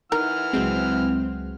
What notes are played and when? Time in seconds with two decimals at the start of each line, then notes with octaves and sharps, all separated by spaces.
0.12 E3 D#4 A#4 F#5 F6
0.53 C#2 F#3 G#3 C4